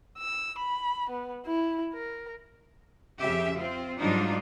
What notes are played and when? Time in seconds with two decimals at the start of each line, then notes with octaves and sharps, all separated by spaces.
0.18 E6
0.58 B5
1.10 B3
1.46 E4
1.94 A#4
3.19 F2 C#3 G4 E5
3.55 C4 F4
3.98 G#2 F#3 G3 D4 D#4 F4